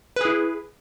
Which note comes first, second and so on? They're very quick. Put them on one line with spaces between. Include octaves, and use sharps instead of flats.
B4 G#4 E4